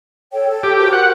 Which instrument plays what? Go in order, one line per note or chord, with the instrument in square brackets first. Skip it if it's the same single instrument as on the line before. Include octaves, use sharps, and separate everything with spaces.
[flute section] A4 C#5 G5
A4
[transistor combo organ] G4
[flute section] F#4 A#4 C5
[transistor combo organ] F#5